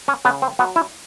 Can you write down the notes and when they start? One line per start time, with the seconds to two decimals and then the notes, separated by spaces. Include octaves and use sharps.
0.08 C#4
0.25 C#3 B3
0.42 C4
0.59 F#3 B3
0.76 E4